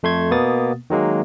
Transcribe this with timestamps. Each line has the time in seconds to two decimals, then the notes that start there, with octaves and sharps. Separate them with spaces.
0.03 F2 A3 C6 G#6
0.31 B2 A#3 B3 D#6 A6
0.90 D#3 F#3 G#3 A#3